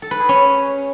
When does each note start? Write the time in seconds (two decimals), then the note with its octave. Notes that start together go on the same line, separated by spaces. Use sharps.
0.02 A4
0.11 B4
0.20 G#4
0.29 C#4